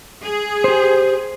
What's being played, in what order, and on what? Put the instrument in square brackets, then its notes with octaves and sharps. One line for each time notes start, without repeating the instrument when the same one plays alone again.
[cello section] G#4
[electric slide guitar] G4 C5